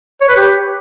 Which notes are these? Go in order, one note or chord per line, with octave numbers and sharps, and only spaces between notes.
C#5
B4
G4